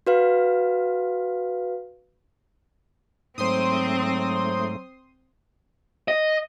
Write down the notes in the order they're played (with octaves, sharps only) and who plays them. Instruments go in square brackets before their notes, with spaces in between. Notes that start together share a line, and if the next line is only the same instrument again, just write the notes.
[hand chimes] F#4 B4 F5
[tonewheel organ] G#2 A3 [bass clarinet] F#3 [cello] C4 [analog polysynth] C5 C6 D#6
[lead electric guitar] D#5